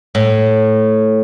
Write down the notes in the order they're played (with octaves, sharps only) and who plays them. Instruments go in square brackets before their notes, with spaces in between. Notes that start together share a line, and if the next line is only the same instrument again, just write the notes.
[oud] A2